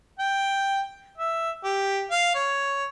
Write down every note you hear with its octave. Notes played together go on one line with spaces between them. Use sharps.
G5
E5
G4
F5
C#5